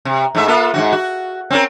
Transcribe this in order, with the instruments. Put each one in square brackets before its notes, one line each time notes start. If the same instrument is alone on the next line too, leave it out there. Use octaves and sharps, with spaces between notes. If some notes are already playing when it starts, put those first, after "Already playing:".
[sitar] C3
G#2 A3 E5
A#3 F4 A4
G#2 E3 F#4
F#4
C4 C#4 A#4